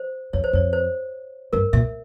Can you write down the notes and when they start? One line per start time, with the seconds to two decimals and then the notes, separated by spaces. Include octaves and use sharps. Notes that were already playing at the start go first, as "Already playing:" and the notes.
Already playing: C5
0.33 F2 C#5
0.44 C5
0.53 F2 C#5
0.73 C5
1.53 G2 A#4
1.73 A#2 E5